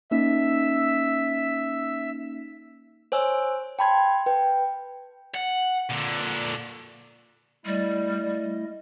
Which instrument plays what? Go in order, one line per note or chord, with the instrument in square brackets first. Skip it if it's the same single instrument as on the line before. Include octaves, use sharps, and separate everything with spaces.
[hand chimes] A#3 C#4 D#4 [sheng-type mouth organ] E5 E6
[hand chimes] C5 C#5 G#5 E6
G5 A5 B5 C6 G#6
B4 G5
[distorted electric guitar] F#5
A#2 D3
[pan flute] G3 [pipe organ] A3 E4 D#5